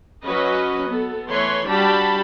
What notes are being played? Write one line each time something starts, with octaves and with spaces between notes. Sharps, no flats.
F#3 C#4 F#4 B4 D#5
B3 A4
E3 A3 B4 C#5 C6
G3 D4 F#4 G4 A5 B5